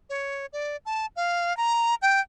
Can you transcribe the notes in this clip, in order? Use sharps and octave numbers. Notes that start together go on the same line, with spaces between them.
C#5
D5
A5
F5
A#5
G5